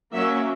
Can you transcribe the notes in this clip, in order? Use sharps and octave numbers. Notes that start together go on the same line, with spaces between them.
F#3 A#3 C#4 E5